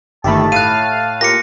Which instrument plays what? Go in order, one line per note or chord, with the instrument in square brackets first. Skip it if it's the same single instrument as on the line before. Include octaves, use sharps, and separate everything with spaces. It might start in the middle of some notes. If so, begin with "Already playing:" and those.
[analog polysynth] G1 D#3 A3 [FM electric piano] G4 E5 B5 [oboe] A5
[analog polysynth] A2 F5 [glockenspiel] F#6 D#7
[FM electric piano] A#3 F4 G4 [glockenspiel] A#6 C#7